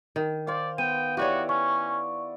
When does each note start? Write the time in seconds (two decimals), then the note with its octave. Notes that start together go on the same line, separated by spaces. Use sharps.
0.16 D#3
0.47 C5 D5 F5
0.78 B3 G5 D#7
1.17 E4 F#4 G4 B4 C#5 D5
1.49 C#4 C#6